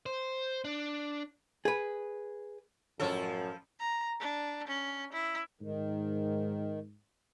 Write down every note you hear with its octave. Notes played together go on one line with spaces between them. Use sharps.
C5
D4
G#4 B4
A1 F#2 F3 A4 C#5
A#5
D4
C#4
E4
G#2 D#3